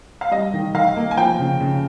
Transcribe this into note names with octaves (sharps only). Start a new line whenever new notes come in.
F5
G3 D#5
D#3
D#3 F5
A#3
G#5
F3 G5
C#3
C#3